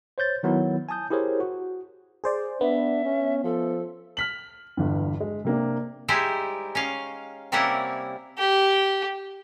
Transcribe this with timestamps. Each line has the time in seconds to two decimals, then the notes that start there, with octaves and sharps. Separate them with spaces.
0.18 C5 C#5 G6 A6
0.43 D#3 F#3 B3 E4
0.89 G#5 A5 D#6 G6
1.11 E4 G4 G#4 A#4 C5 C#5
1.40 F#4
2.24 G#4 C5 D5
2.61 B3 D4 E5
3.05 C#4
3.44 F3 A4
4.17 F6 B6 F#7
4.77 G1 E2 G2
5.20 G#3
5.45 C3 A#3 D4
6.08 G3 G#3 D#4 E4 G4 C5
6.75 C#4 D#5 F5
7.52 C3 G3 A#3 C#4 E4 F#5
8.38 G4